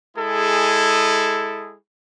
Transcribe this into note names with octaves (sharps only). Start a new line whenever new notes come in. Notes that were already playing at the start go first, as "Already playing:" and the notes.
G#3 E4 G#4 A4